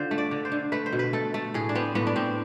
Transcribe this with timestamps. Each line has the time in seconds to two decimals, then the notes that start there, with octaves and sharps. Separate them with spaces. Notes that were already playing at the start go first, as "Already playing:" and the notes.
Already playing: D3 F4 C5
0.11 A3
0.18 D5
0.31 D3
0.45 C5
0.52 D3
0.72 A3 B4
0.86 C5
0.93 B2
0.99 B4
1.13 A3 A4
1.34 A3
1.54 A2 G#4
1.69 D4
1.75 B3 C4
1.95 A2 B3
2.07 D4
2.16 A2 C4